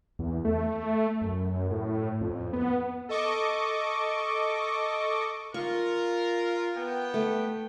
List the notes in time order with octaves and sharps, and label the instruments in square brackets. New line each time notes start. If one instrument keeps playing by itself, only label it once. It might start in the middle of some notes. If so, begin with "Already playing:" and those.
[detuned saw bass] E2
A3
F#2
A2
F2
B3
[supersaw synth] A4 D#5 C#6 D6
[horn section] F4 A#4 [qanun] C#6
[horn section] B3 G5
[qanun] A3